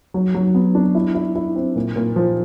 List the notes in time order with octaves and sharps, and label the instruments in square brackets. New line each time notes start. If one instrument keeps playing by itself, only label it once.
[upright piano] F#3
F#3
B3
D4
E4
E4
E4
C4
A#2
A#2
F3